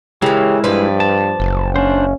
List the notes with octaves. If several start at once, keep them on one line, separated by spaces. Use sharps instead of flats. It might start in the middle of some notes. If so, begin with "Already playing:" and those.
C#3 E3 G#3 E4 G4 A#4
G2 F3 B4 D5
A5
F#1
C#4 D4 C5